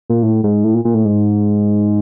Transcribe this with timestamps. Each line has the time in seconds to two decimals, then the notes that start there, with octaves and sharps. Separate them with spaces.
0.10 A#2
0.23 A2
0.44 G#2
0.64 A2
0.74 A#2
0.85 A#2
0.94 A2
1.05 G#2